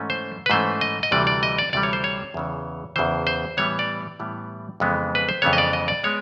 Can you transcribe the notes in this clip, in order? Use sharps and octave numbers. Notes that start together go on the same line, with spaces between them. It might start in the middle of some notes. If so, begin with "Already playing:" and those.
Already playing: G#2 E3 A3 C#4
C5
B4
G#2 E3 A3 C#4 C5
D#5
D#5
D2 C3 E3 G3 D5
D5
D#5
D5
D2 C3 E3 G3 D5
C#5
C5
C#5
E2 C#3 E3
E2 C#3 E3 C5
C5
A2 E3 G3 B3 C#5
D5
A2 E3 G3 B3
F2 C#3 E3 G#3 B3
B4
C5
F2 C#3 E3 G#3 B3 C#5
D#5
D5
D#5
D5
G#3 B3 C#5